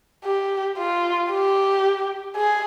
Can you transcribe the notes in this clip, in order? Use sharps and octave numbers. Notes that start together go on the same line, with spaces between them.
G4
F4
G4
G#4